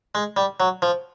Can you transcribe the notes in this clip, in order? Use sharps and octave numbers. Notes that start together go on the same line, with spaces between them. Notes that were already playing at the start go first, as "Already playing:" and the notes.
G#3
G3
F#3
F3